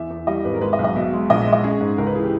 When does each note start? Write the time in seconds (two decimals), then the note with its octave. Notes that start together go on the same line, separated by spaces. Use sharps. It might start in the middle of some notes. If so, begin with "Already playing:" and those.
Already playing: E2 E5
0.10 E2
0.27 G3 D#5
0.45 G#1 B4
0.54 A#4
0.61 G#3 B4
0.73 D#5
0.79 B1
0.84 D#5
0.96 B2 E5
1.13 G#3
1.30 A#1 D#5
1.41 E5
1.47 G#3
1.53 D#5
1.64 C#4 G#4
1.81 G#2
1.98 C#2 A#4
2.07 B4
2.15 E3 G#4
2.24 G4